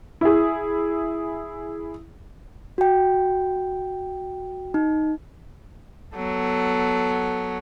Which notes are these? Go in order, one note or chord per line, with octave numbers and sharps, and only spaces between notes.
E4 G#4
F#4 G5
D#4
F#3 B3 A4